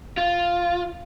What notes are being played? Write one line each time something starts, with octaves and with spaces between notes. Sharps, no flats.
F4